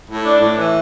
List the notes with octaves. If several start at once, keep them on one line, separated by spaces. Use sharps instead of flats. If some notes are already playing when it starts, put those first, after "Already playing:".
A2
D4
A2
E3